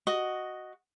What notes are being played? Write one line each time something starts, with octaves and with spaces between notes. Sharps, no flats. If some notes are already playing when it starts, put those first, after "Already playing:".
F#4 D#5